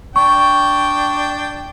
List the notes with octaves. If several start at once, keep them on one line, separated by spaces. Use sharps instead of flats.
D4 G5 C#6